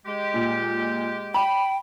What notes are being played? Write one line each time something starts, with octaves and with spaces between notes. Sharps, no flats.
G#3 G4
A#2
G5 B5